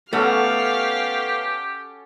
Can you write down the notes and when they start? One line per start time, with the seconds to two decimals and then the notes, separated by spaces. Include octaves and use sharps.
0.13 A3 B3 C#4 F#4 G4 A4 F5